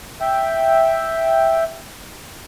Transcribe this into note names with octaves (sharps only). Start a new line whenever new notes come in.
E5 G5